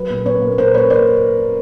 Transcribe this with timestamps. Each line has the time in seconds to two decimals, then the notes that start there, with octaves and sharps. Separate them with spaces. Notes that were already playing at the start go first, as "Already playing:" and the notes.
Already playing: F#3 B4
0.10 A#2
0.26 A#2 B4 C#5
0.42 A#3
0.58 A#2 A#4 C5
0.74 A#3 B4 C#5
0.90 A#3 C5 D5